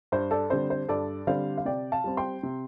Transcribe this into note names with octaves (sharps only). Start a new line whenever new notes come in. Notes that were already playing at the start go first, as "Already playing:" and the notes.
G2 C5
A4 D5
D3 G3 C4 C5
C5
G2 A4 D5
D3 G3 C4 C5 F5
F5
C3 D5 G5
F5 A5
G3 C4
G5 C6
C3